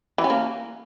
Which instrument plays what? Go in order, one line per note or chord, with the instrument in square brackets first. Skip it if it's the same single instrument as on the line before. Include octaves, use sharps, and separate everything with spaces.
[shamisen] E3
C#4
A#3